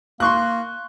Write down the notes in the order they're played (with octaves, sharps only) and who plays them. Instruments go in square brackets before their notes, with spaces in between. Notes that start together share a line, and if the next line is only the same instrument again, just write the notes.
[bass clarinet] A#3 [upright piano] C6 C#6 F#6